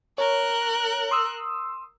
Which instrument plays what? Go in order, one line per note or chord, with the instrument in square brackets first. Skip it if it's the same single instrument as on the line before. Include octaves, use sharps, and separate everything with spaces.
[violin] A#4 F#6 [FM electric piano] C#5
[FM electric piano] C6 D#6 E6